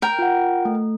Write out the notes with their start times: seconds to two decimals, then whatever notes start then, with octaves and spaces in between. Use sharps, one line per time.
0.02 A#4 G5
0.19 F4 F#5
0.65 A3